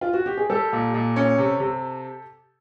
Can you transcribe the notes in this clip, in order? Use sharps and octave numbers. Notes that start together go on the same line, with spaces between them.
F4
F#4
G4
G#4
G3 G4 A4
A#2
A#2
C#4
C3
C3